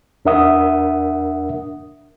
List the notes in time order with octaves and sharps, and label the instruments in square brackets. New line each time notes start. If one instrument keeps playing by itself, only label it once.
[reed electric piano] E2 D4 A#4 E5 F#5 D#6